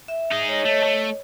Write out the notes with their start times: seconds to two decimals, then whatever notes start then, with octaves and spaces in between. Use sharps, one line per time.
0.08 E5
0.31 D#4 G#4
0.48 C#5 D#5
0.65 A3
0.83 A3